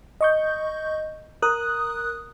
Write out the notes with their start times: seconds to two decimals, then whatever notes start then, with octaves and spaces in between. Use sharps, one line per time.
0.21 D#5 C#6 G6
1.42 A#4 D#6 F#6